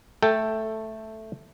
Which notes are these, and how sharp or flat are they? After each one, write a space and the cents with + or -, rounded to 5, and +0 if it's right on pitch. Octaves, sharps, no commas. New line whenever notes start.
A3 +0 A4 +5 G5 +0